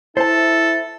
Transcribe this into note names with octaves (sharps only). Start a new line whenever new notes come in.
E4 A4 C5 A5